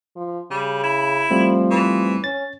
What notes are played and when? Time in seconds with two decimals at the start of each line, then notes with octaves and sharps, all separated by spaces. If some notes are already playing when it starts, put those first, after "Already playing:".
0.16 F3
0.51 C#3 G3
0.83 E4
1.31 F3 G3 A3 C4
1.71 E3
2.24 C#4 A6